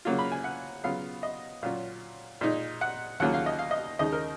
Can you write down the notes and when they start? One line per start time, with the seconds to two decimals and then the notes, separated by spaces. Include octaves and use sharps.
0.05 C#3 F#3 A#3 F4
0.19 B5
0.32 G#5
0.44 F#5
0.84 C#3 F#3 B3 F4 F5
1.23 D#5
1.63 A#2 F#3 C#4 F4 F5
2.41 A#2 G#3 D#4
2.81 F#5
3.20 D#2 C#3 F#3 A#3 F4 F#5
3.34 F5
3.46 D#5
3.59 F5
3.71 D#5
3.99 D#2 C#3 G#3 D#4 D#5
4.12 A#4